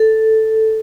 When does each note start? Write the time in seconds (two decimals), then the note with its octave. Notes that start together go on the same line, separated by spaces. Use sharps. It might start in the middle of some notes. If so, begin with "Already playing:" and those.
Already playing: A4